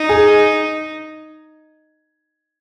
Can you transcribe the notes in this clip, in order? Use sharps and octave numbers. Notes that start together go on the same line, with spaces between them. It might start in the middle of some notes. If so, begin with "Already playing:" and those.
Already playing: D#4
G#4